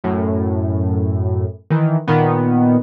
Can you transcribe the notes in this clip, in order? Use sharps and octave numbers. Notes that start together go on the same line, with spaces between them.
F#2 A2
D#3 E3
A#2 D#3 B3